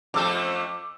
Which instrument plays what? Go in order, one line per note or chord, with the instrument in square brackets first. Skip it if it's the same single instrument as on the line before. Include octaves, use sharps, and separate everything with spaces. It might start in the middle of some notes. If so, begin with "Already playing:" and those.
[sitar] F2 A3 A4 [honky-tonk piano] D6 E6